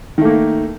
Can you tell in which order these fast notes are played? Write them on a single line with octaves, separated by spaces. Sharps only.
D#3 A3 A#3